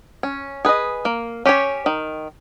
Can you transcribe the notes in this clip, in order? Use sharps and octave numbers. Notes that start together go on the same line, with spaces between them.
C#4
G#4 B4 D#5
A#3
C#4 G4 C#5
D#3